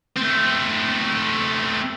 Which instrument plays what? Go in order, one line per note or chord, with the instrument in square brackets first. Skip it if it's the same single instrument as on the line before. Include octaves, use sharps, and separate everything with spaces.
[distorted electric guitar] A3 C4